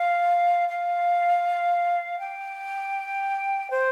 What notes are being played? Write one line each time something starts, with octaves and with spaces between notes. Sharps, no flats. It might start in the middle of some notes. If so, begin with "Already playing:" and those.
Already playing: F5
F5
G5
C5